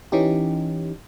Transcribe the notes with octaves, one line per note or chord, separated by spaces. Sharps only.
E3 C#4 D#4 G4